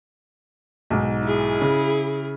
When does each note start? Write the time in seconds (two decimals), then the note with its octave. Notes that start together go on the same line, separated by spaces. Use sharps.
0.90 B1 G#2
1.24 E4 G#4
1.61 C#3